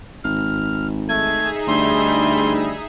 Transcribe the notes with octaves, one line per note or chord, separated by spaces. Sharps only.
G#1 F6
A3 D#4 G#4 E5 G#6
D2 G3 C6